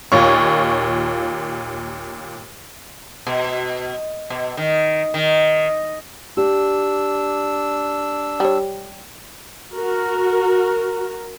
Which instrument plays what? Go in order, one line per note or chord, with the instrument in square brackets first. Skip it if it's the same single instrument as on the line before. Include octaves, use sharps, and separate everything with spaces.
[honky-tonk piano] D#2 A#2 F4 C#5 C#6
[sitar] B2
B2
D#3
D#3
[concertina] D4 E6 [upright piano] G4
[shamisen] G3 C#5
[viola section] F#4 A#4